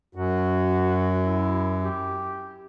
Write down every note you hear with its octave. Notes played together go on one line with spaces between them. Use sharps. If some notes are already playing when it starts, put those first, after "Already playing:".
F#2 F#4
E4
G4